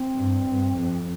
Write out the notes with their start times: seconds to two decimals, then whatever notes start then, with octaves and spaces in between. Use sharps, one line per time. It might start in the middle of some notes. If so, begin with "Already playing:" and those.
Already playing: C4
0.15 G2
0.46 G2
0.78 F2